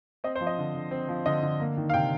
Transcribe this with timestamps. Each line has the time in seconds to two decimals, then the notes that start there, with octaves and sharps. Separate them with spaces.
0.24 C4 D#5
0.36 C5
0.41 F3
0.47 D#5
0.58 D3
0.75 D3
0.91 C4
1.09 F3
1.26 D3 D#5
1.42 D3
1.60 A#3
1.77 D#3
1.90 F5
1.94 C3 G5